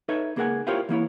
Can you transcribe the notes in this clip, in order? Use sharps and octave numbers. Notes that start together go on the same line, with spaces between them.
D#4 A4 B4 C#5 D#5 E5
C#2 A#3 G#4 A#4 F#5 G#5
E4 F4 G4 A#4 C5 C#5
E3 A#3 E4 C#5